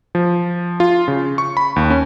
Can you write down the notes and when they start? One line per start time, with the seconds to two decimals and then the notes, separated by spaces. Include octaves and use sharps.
0.15 F3
0.80 F4
1.08 C#3
1.38 C#6
1.57 B5
1.76 D#2
1.90 C#4